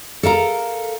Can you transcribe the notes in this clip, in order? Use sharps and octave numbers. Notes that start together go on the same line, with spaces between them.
A4 A#4 F5 A#5